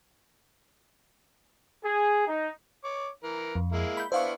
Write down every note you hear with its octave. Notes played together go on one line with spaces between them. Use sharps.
G#4
D#4
C#5 D6
E3 A#4
F2
G#3 A#3 E4
B5 G6
B3 D4 E4 C5 F5 C#6